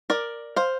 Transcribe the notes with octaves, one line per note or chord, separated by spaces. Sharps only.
A#4 D5
C5 F5